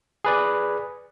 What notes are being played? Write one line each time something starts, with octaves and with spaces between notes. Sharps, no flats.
G#4 B4 D5